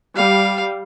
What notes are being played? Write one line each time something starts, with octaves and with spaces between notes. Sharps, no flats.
G3 F5